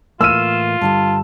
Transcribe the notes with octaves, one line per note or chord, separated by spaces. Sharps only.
A2 E3 A#3 F4 E6 F6 D#7 E7
G2 D3 G3 A5